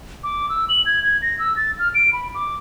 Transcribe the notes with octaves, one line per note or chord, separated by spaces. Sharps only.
D6
E6
F#7
G#6
G#6
A#6
E6
A6
F6
D7
B5
D6